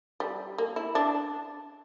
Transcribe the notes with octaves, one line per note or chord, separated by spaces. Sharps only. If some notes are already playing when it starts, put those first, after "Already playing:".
G3
A#3
E4
D4